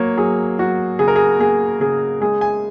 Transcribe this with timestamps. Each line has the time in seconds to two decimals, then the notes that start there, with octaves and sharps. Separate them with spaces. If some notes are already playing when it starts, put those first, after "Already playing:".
Already playing: F#3 A#3 C#5
0.17 F#3 G#4
0.59 F#3 F#4
0.99 C#3 G#4
1.08 A#4
1.16 G#4
1.39 A#3 G#4
1.80 C#3 G#4
2.21 G#3 G#4
2.41 G#5